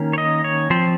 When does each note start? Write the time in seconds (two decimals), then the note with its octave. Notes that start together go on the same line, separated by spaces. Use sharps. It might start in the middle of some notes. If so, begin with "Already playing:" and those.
Already playing: D#3 A#3 C#4
0.13 C#5
0.18 D#5
0.44 C#5
0.70 F3 C4 C5